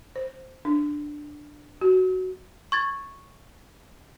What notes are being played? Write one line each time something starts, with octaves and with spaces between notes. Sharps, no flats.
C5
D4
F#4
C#6 G#6 A6